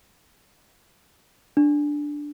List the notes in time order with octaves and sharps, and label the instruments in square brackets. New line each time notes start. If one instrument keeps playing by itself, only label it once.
[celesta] D4